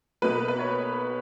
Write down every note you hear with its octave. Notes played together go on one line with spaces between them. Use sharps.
B1 B2 A#3 B4
B4
C#5